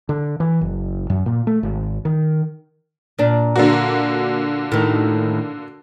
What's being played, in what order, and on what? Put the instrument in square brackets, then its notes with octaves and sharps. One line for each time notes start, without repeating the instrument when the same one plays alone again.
[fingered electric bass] D3
E3
F#1
F#2
A#2
A3
G#1
D#3
[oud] A#2 D4
[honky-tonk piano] D3 A#3 F#4
[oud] A2 D#3